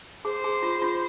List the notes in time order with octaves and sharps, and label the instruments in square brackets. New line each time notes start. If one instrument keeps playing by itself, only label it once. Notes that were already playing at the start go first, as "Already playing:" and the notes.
[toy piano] G#4 [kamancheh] C5
[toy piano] G#4
F4
F4